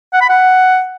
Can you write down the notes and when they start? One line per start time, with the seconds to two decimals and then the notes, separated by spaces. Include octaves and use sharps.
0.13 F#5
0.21 B5
0.29 F#5